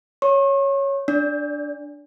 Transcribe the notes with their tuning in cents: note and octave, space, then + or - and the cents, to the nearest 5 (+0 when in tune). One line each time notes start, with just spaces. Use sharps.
C#5 +0 C#6 -40
D4 +0 D5 -35